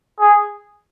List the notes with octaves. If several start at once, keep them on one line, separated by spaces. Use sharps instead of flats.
G#4